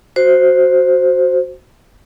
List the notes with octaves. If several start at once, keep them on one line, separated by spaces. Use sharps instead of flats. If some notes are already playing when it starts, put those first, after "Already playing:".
F#4 C5